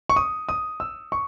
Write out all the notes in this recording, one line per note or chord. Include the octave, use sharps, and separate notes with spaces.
C#6
D#6
D#6
E6
C#6